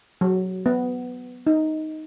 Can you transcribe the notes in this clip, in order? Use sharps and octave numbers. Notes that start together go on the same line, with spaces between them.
F#3
B3
D#4